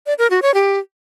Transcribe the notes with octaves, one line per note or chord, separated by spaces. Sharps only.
D5
A#4
F#4
C#5
G4